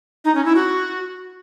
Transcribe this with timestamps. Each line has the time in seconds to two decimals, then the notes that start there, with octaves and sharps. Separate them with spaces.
0.25 D#4
0.35 C#4
0.45 E4
0.55 F#4